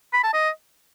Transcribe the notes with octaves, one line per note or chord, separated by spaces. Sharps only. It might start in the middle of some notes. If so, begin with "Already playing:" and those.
B5
A5
D#5